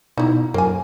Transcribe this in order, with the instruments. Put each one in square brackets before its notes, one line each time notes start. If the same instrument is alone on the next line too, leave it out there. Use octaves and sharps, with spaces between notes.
[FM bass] B2 [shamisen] D#4 E4
[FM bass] F#2 [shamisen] A#3 G#5